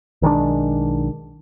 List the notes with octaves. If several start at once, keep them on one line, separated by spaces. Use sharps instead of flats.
B1 D#3 G#3 D4